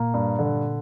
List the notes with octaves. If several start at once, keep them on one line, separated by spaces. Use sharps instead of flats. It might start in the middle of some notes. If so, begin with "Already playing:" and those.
Already playing: A#2 A#3
G2
D3